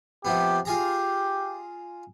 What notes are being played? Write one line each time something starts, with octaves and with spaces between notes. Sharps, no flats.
C3 F3 B3 G4
F4 G4 G#4 A#5